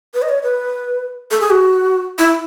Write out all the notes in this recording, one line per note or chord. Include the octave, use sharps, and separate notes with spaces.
B4
D#5
C#5
B4
A4
G#4
F#4
E4